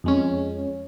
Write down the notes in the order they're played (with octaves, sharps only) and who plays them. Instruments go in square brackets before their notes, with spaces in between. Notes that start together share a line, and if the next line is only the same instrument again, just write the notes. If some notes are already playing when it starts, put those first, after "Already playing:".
[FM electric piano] F2 G#3 C#4